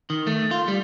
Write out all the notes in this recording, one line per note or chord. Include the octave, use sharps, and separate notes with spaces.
D#3
A3
F4
G3